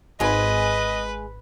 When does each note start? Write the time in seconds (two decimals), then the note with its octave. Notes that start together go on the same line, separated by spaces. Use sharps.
0.20 G#1 G#2 G#3 B4 D#5 G#5